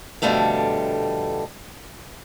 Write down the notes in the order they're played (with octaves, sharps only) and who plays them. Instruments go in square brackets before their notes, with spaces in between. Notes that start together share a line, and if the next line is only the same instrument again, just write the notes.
[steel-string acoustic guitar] F2 B2 D3 G3 A3 F5